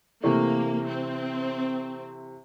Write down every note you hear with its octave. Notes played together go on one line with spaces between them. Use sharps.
C3 E3 A3 A#3
C4